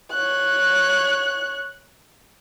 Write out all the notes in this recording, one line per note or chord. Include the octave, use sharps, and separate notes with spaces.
C#5 F#6